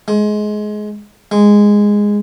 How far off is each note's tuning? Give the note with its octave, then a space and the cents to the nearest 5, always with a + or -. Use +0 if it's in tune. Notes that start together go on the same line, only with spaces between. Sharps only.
G#3 +20
G#3 -10